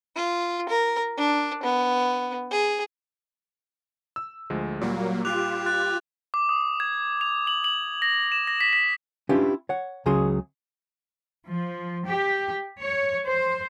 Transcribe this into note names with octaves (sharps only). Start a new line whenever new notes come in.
F4
A#4
D4
B3
G#4
E6
D2 F3 G#3
A#2 F#3 G3 A#3
F4 G4 D6 F#6 F7
F#6 A6
D6
D#6
G#6
F7
F#7
F#7
A#6
E7
A#6
B6
B6
C#4 D4 E4 F4 G4 B4
C#5 F#5
C#2 C#3 F#3 G#4 C6
F3
G4
C#5
C5